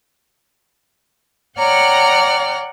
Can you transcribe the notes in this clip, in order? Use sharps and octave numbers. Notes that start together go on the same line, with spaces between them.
C#5 D5 F#5 G5 A#5 F6